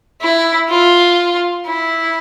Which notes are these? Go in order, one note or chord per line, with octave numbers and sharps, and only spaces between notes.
E4
F4
E4